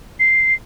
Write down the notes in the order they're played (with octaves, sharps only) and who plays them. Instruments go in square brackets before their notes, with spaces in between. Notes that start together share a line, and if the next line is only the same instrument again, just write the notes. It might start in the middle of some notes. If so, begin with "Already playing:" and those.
[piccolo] C7